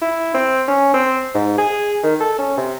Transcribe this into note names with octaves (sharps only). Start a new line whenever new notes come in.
E4
C4
C#4
C4
G#2
G#4
D#3
A4
C#4
C3